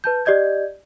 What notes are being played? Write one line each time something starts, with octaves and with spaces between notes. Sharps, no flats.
B4 A5 G6
G4 D5 D#5 G6 G#6